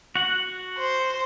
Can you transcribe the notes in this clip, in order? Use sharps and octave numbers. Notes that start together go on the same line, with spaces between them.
F#4 F#5
C5